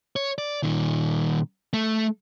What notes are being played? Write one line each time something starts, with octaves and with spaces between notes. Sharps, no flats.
C#5
D5
A#2 D#3
A3